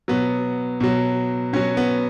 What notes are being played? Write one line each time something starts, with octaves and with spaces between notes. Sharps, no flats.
B2 F#3 B3
B2 F#3
B2 F#3 C#4
B3